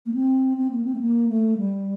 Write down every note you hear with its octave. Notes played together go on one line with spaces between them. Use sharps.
A#3
C4
C4
A#3
C4
A3
A#3
A3
G3